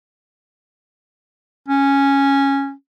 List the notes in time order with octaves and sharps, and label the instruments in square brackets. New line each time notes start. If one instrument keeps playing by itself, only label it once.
[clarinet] C#4